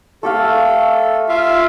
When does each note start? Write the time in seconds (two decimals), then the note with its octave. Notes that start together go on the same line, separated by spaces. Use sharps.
0.23 A3 G4 A4 F5
1.29 F4 E5 F5